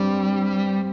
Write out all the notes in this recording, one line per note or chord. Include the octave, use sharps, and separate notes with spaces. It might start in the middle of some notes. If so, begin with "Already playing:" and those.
Already playing: G2 G3 C4